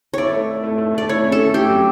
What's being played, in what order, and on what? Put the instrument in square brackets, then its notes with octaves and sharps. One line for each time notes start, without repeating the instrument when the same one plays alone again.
[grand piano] E4 [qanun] C#5 D5
[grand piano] A3
E4
A3
A3
[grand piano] A3 [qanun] D5
[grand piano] E4 [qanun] C#5
[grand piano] C#4
[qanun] A4
[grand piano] A3
[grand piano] A3 [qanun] G4
[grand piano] F#3